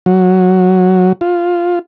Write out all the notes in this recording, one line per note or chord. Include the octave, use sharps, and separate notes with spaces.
F#3
F4